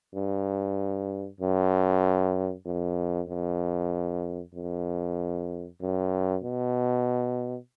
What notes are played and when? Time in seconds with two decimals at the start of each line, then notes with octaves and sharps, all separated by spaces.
0.14 G2
1.40 F#2
2.65 F2
3.28 F2
4.54 F2
5.81 F#2
6.44 B2